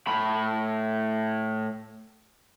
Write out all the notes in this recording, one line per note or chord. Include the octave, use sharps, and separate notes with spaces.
A2 B5